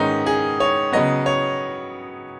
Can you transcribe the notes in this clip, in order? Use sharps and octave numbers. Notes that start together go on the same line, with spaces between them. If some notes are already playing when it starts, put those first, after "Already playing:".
Already playing: G#2 D#3 G#3 B3 C#4 D#4
G#4
C#5
C#3 F#3 B3 D#5
C#5